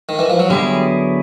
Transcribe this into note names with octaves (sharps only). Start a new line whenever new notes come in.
D#3
E3
F3
F#3
D3 F#3 G3 B3 E4 G#4